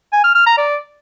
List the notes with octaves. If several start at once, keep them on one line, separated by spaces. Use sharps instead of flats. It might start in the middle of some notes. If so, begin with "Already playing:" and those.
G#5
F6
F6
A#5
D5